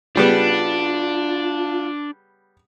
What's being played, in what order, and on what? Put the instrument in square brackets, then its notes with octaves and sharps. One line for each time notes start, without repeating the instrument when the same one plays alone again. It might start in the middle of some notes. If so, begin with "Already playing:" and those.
[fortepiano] C#3 G3 B3 [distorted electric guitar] D4 [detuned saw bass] F4